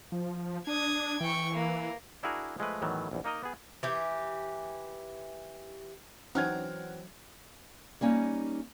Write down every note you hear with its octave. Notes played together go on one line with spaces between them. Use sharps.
F3
D4 D#6 G#6
E3 G5 C#6
A#3
D4 E4 F#4 G#4 A#4
F3 G#3 A3 B4
E2 A2 D#3 E3 F#3
A#1 E2
A#3 D#4 A#4 D#5
B3 G#4
E3 G4
E3 F#3 C4 C#4 D#4 F#5 F6 G#6
G3 A#3 C#4 D#4